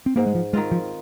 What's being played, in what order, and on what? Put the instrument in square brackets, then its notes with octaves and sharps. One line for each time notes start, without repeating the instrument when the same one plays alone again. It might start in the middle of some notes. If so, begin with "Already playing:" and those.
[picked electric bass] C4
[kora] G#2 [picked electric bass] A#3
[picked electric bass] G#3
F3
[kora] D#3 C4 F4 [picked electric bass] G#3
[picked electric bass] F3